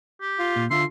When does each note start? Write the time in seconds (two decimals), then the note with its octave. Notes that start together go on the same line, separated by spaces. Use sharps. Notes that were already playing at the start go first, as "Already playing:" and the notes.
0.21 G4
0.39 F4
0.56 A#2
0.70 D3 F4 E5 C6